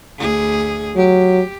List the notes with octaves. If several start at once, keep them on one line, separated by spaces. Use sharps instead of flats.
D2 G#4
F#3 G4